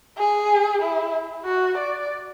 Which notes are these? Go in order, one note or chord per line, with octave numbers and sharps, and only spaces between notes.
G#4
E4
F#4
D5